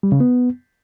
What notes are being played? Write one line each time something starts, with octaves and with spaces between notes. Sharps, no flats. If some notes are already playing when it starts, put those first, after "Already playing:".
G3
C#3
B3